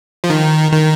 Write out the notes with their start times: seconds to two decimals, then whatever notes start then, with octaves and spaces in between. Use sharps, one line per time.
0.24 F3
0.30 D#3
0.72 D#3